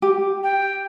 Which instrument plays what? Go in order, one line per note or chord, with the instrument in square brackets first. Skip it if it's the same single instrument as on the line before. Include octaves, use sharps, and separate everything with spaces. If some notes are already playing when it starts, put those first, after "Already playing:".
[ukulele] G4
[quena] G5